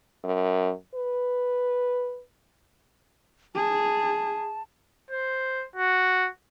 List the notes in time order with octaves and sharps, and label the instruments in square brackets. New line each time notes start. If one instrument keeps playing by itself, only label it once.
[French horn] F#2
B4
[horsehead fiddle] G#4 [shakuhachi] A5
[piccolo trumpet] C5
F#4